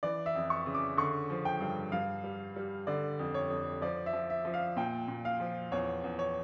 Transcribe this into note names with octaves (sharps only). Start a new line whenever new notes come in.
E3 D5
E5
F2
C#6
C#3
D6
D3 C#6
F3
G5
G2
G2 F5
G3
G3
D3 D5
F2
C#5
F2
F3 D5
E5
F3
E5
F3
F5
A#2 G5
A#2
F5
F3
E2 C#5
E2
C#5